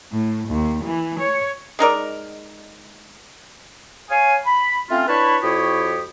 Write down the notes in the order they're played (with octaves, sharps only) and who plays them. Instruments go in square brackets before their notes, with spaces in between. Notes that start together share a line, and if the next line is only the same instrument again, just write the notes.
[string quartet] A2
D#2
E3
C#5
[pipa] G#3 D#4 A#4 D5
[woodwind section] C#5 F5 G#5
B5
A3 C4 C#4 F4
D4 E4 B4 C#5 A5 B5
F2 E4 F#4 G4 C#5 D#6